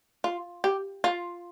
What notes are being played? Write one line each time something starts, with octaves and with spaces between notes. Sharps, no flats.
F4
G4
F4